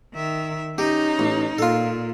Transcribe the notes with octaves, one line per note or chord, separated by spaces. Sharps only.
D#3 E5
C#4 D#4 G4
A1
A#2 F4 A4